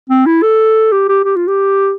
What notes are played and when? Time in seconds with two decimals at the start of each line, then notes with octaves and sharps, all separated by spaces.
0.10 C4
0.26 E4
0.42 A4
0.92 G4
1.09 G4
1.24 G4
1.36 F4
1.48 G4